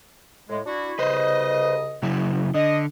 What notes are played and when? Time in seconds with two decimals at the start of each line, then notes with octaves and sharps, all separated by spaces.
0.49 A2 G#3
0.66 D4 E4 F#4
0.99 C2 C#3 B4 C5 D#5
2.02 C#3 F#3 E4
2.54 D3 D#5